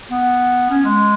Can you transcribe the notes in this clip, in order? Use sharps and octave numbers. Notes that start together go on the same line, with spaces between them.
B3
C#4
G#3